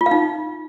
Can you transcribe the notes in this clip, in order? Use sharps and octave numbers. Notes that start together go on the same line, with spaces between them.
F4
F5
D#4